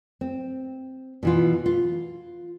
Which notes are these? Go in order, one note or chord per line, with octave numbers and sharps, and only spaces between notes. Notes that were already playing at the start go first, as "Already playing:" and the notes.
C4
B2 E3 F4
F4